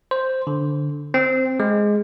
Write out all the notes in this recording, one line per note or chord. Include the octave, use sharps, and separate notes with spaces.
C5
D3
C4
G#3